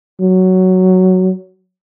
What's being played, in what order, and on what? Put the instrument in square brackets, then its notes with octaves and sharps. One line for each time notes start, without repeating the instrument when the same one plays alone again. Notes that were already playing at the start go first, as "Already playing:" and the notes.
[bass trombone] F#3